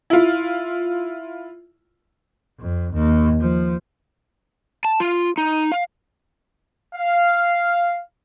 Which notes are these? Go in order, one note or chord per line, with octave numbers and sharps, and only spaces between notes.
E4 F4
F2
D#2
F3
A5
F4
D#4
F5
F5